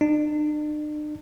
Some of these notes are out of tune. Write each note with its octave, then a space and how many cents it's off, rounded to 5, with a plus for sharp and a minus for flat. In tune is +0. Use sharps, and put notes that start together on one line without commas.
D4 +45